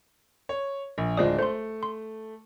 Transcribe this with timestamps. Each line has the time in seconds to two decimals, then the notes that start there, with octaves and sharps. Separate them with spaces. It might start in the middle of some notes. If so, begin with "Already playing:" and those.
0.49 C#5
0.98 A#1
1.17 D1 G#3 D4 F4 C5 D#6
1.39 A3 C5 C6
1.83 C6